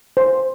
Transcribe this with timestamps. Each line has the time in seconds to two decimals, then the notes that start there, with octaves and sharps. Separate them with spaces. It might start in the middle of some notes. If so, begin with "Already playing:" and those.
0.17 C5